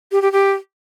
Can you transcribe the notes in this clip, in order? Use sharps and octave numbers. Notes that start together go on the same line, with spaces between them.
G4
G4
G4